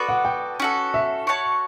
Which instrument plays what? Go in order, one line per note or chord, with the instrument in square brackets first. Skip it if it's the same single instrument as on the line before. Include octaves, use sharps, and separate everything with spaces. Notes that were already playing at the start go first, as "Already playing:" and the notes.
Already playing: [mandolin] B3 F#4 A4 D5
[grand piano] F#5
G5
[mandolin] C#4 F#4 A4
[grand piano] E5
[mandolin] F#4 C#5 F#5 A5